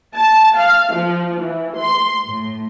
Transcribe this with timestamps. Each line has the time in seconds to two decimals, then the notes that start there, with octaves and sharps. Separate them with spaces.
0.16 A5
0.57 F5
0.94 F3
1.43 E3
1.78 C6
2.27 A2